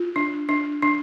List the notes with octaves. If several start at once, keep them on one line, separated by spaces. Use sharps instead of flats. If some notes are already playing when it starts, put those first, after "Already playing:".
Already playing: F4
D4
D4
D4